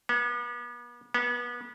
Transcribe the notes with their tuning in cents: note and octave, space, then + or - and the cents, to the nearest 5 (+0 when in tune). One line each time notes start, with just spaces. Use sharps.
B3 -40
B3 -30